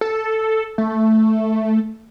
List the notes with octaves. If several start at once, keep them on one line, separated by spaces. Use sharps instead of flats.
A4
A3